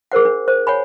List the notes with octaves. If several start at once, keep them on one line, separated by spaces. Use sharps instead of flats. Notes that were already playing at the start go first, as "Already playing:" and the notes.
G#4 A#4 C5 F#5
D4
C5
C#5 F#5 G#5 B5